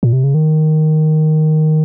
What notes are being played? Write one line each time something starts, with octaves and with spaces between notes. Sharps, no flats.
A#2
C3
C#3
D#3